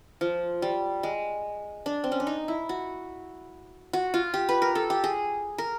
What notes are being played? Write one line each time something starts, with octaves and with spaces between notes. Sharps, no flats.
F3
G3
G#3
D4
C4
C#4
D4
D#4
E4
F#4
F#4
F4
G4
B4
A#4
A4
G4
G#4
A#4